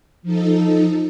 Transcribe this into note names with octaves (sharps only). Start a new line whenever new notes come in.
F3 D#4 A4